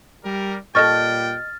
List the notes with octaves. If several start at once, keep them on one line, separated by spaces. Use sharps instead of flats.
G3 A#4
A#2 G3 A4 D#5 G5 C#6 F6 A6